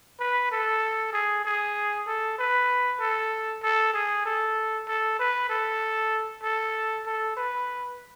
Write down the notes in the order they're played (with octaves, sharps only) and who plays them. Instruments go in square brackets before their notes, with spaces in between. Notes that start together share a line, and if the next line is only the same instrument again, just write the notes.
[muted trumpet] B4
A4
G#4
G#4
A4
B4
A4
A4
G#4
A4
A4
B4
A4
A4
A4
B4